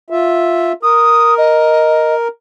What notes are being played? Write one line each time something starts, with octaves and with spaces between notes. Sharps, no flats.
F4 E5
A#4 D#6
D#5